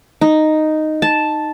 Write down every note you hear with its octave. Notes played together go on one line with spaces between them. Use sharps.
D#4
A5